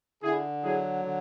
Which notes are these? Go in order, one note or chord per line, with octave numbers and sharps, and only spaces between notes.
D3 E4 G#4
F#3 E4 G#4
D3